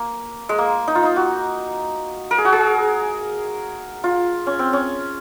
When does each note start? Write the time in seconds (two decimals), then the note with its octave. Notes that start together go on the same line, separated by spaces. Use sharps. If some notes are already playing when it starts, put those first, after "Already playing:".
Already playing: A#3
0.49 G#3
0.58 A#3
0.88 D#4
0.95 F4
1.03 D#4
1.16 F#4
2.31 A#4
2.38 G#4
2.45 F#4
2.52 G#4
4.04 F4
4.47 C#4
4.59 C4
4.73 C#4